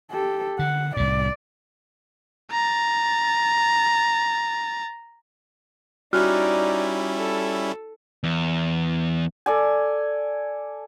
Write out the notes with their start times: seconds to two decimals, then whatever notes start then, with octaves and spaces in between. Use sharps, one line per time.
0.11 G4 A4
0.59 D3 F#5
0.97 C2 A2 D5
2.51 A#5 A6
6.13 G3 C#4 D#4 E4 F#4 D5 F6 F#6
7.16 A4
8.24 E2
9.46 A4 D5 G#5